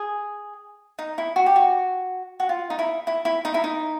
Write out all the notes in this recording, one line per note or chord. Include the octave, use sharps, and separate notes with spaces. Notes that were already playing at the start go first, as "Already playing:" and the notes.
Already playing: G#4
D#4
E4
F#4
G4
F#4
F#4
F4
D#4
E4
E4
E4
D#4
E4
D#4